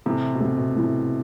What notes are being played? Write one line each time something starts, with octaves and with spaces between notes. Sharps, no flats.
A2 C3 E3 A3 E4
B2
A2 C3 E3 A3 E4
B2
A2 E3 A3 E4